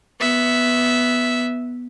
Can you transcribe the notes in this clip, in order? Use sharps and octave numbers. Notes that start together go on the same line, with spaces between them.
B3 E5